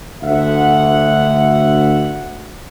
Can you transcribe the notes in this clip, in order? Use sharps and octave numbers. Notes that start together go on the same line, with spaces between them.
D2 E5 F#5